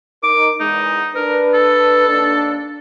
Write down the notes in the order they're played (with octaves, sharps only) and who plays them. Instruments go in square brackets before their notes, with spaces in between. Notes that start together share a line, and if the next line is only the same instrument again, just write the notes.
[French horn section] D#4 A#4 [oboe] D6
[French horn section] E2 G#3 [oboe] D#4
[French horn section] D4 B4 [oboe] A#4
[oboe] A4
[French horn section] D#2 D4